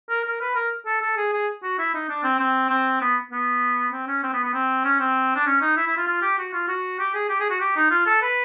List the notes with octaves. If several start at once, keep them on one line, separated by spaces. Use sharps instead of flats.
A#4
A#4
B4
A#4
A4
A4
G#4
G#4
F#4
E4
D#4
D4
C4
C4
C4
B3
B3
C4
C#4
C4
B3
B3
C4
C#4
C4
D4
C#4
D#4
E4
E4
F4
F4
G4
F#4
F4
F#4
G4
G#4
G4
G#4
F#4
G4
D#4
F4
A4
B4